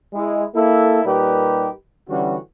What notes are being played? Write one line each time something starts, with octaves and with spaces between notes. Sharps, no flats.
G#3 E4
A#3 E4 A4
A#2 G3 D#4 G4 A#4 B4
D3 E3 G3 C#4 F#4